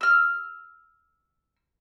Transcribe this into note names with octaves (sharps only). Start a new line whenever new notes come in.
E6 F6